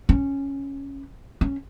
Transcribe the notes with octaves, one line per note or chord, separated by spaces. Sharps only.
C#4
C#4